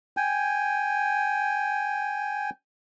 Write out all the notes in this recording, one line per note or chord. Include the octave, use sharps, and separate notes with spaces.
G5 G#5